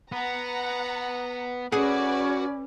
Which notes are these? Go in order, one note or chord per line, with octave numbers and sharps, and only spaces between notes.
B3 F#5 A#5
C#4 F#4 G#4 B4 D5 F#5